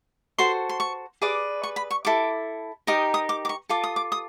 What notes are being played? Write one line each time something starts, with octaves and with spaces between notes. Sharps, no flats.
F#4 A4 C5 C6
C6
C#6
G#4 B4 D5 D6
C#6
B5
C#6
E4 A4 D6
D#4 G4 A#4 D#6
D#6
D6
D6
C#6
F4 A4 D6
D#6
D6
D#6